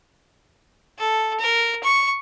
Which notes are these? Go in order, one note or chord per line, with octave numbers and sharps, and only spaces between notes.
A4
A#4
C#6